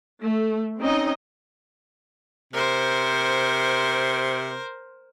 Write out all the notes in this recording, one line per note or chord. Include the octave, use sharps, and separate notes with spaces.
A3
C4 C#4 D#4 D#5
C3 A#4 C5